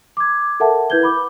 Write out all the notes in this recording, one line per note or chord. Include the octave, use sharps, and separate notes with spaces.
D6 G#6
A4 A#4 E5 F#5 A5
E4 B4 G6 G#6 G7
B5 D6